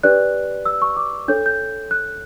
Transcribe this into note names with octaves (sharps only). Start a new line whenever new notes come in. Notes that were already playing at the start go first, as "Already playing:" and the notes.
D4 G4 B4 D5 F#6
E6
C#6
D6
D4 A4 C#5 G6
G6
F#6